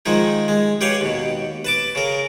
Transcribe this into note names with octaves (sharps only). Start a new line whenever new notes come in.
D#3 F3 G#3 D#4
G#3
G4 B4 C#5 F5 F#5 G#5
D#2 B2
B4 A5 D6
C#3 A#4